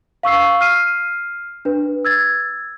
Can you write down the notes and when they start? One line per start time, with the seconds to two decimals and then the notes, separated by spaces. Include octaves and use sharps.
0.23 F5 C#6 E6 C7
0.61 F6 C7 D#7
1.65 D4 B4
2.05 E6 G#6 A6